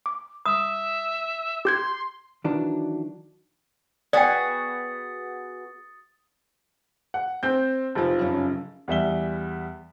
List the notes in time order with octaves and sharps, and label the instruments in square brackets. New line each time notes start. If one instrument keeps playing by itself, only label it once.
[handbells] D6
[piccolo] E5 [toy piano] D#6
[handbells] G4 G6 G#6 [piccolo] C6
[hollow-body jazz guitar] D#3 E3 F#3 D4
[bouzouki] B3 F#4 G#4 [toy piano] D5 G5 [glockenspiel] D#6 A6 C#7
[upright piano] F#5
C4 G6
F1 F3
[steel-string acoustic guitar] F#2 C#3
[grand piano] E2 G3 E5 G7